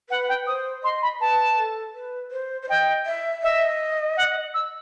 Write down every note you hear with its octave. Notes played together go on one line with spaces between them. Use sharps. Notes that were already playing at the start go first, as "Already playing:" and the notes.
B4 F#5
G5
C5 D#6
D#5 C6
B5
B4 A5
A4
B4
C5
C5
D#5 G5
E5
D#5 E5
F#5
E6